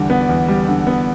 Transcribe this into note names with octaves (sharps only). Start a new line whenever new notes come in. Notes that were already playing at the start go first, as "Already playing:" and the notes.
Already playing: E2 D3 G3
B3
E2
G3
D3
B3